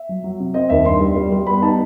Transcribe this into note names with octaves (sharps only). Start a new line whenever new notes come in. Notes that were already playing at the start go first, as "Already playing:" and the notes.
Already playing: E5
F#3
F#3
C3
C4 D#5
D#2 E5
G2 C6
G3
G3
G3
B3 B5
D#4 A5